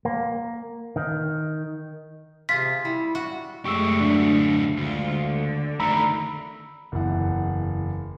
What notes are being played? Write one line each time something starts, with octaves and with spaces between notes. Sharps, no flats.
A#3
D#3
C3 F4 G#4 B6
G3 E4
F#4
F#2 G#3 A3 G4 C#6 E6
D3 F#3 D4
D2 G#3 F4
D3
D#3 A3 A#5 B5 E6
F#1 E2 E4 F#5